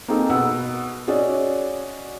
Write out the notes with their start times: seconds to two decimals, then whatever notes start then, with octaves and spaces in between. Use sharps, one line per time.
0.08 A#3 C4 D#4 G#4 A4
0.30 B2 B4 F#5 E6
1.07 C#4 F#4 G#4 D5 D#5